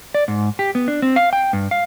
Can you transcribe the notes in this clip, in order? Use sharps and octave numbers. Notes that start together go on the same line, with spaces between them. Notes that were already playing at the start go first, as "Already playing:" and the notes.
D5
G#2
G4
B3
D4
C4
F5
G5
G2
F5